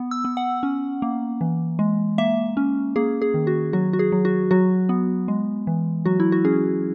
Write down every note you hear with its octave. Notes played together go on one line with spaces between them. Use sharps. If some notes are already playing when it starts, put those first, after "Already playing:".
Already playing: B3
E6
B3
F#5
C#4
A#3
E3
G#3
A#3 E5
C#4
A#3 G#4
G#4
D#3
F#4
F#3 F#4
F#4
G#4
F#3
F#4
F#3 F#4
B3
G#3
E3
F#3 F#4
E4
F#4
C#4 G#4